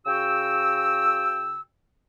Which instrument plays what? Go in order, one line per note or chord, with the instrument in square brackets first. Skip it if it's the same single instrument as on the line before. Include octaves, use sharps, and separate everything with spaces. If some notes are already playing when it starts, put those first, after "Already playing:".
[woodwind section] C#3 F#4 G5 E6